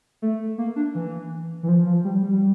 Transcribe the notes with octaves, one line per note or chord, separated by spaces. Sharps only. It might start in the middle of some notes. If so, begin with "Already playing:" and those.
A3
A#3
D4
E3
E3
F3
F3
G3
G3
G3